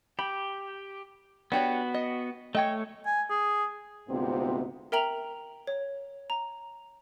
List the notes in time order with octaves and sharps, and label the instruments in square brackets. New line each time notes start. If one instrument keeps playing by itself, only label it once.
[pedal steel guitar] G4 [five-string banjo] B5
[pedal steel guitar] B3 F#4 [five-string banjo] D4 G4 C#5
[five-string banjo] D#5
[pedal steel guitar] A3 C#5 [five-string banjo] D#5 G5 G#5
[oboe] G#5
G#4
[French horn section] D2 G#2 C3 B3 C4 F4
[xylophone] A#4 E5 G5 A#5 F7 F#7
C#5
A#5